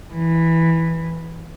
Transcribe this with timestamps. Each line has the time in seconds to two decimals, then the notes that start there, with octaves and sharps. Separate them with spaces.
0.12 E3